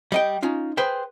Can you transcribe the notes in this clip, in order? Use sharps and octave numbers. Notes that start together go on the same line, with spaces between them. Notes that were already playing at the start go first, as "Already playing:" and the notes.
G3 D#5 G5
C#4 D#4 F4
G#4 B4 C5 G5